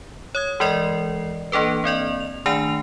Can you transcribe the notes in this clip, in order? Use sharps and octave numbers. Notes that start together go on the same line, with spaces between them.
C#5 D#6 G#6
E3 G#3 A#4 D5 D#5 C7
E3 A#3 D4 A4 B4
A#3 C4 D5 D#5
F7
D#3 A3 D4 G#5 C7 F7